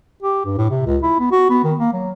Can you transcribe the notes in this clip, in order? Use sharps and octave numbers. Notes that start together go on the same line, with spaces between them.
G4
G2
A2
C3
C#2
E4
B3
F#4
B3
D#3
A#3
F#3